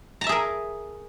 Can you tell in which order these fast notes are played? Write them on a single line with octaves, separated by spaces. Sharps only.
A#5 A5 E5 G#4 A#4